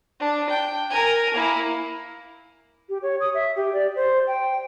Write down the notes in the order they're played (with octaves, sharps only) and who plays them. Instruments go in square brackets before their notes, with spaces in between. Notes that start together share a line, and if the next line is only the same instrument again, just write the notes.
[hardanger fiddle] D4
G5
A#4 G#5
A#3 E4
[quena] G4
C#5
D#6
E5
G4
D5
C5
G5